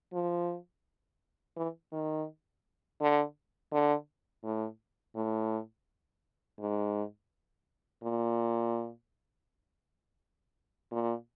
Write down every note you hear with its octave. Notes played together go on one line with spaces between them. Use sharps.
F3
E3
D#3
D3
D3
A2
A2
G#2
A#2
A#2